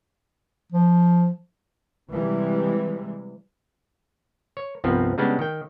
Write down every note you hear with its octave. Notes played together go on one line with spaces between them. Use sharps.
F3
C3 E3 G3 G#3
C#5
C2 G2 F3 B3 C4
C#3 G3 G#3 B3 C#4 D4
D#3 G5